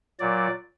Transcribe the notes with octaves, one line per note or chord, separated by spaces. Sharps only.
A#2 F#3 D5